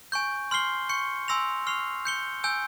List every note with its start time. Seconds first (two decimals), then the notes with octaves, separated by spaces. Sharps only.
0.12 G#5 C#6 G6
0.51 C6 F6 C7 G7
0.89 C#6 G6 C#7
1.28 G#5 C6 E6 A#6 F7
1.67 C#6 F6 C7 F7
2.05 G6 C#7 G7
2.44 G#5 E6 G6